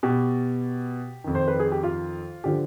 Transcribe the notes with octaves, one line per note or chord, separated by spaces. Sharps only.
B2 G4
F2 D#3
C5
B4
G#4
G4
F4
D3 F3 G4